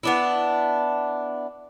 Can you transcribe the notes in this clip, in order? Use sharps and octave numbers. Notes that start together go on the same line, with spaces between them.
B3 D4 E4